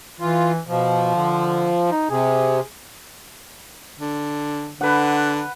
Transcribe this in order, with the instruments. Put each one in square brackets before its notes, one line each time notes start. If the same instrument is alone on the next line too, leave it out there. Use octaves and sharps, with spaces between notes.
[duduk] E3 [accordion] F4
[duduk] B2 [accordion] F3
[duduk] D3
D#4
[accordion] C3 [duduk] G#4
[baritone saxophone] D3
[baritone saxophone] D3 [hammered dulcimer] B4 F#5